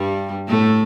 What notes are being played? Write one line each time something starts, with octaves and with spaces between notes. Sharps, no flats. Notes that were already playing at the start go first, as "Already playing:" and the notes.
Already playing: G2 G3
A2 A3